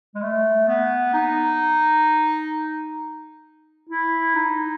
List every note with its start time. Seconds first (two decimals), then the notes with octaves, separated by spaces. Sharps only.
0.15 G#3
0.22 A3
0.68 B3
1.14 D#4
3.89 E4
4.36 D#4